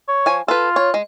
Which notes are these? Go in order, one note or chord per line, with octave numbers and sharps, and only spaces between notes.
C#5
F3 G#5
F4 A4 B4
C#5
G#3